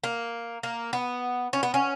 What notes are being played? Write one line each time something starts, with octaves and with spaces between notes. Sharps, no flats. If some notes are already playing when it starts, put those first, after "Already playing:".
A#3
A#3
B3
C#4
B3
C#4